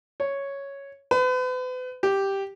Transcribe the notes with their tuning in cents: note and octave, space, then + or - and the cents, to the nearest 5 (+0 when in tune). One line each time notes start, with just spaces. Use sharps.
C#5 +0
B4 +40
G4 +0